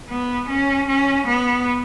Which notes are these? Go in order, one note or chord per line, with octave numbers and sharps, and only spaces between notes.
B3
C#4
C#4
B3